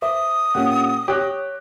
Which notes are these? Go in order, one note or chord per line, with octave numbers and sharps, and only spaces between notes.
C5 E5 D6 D#6
A#2 C#4 G4 F#5
G4 C#5 D6 F#6 A#6